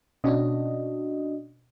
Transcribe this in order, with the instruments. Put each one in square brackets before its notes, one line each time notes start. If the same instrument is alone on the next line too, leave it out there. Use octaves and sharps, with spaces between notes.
[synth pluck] B2 C#4 [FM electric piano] D4 F#4 D#5